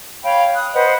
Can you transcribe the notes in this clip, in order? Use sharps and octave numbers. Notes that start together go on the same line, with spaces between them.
C#5 F5 G5 B5
D#6 F#6
B4 C5 D#5 F#5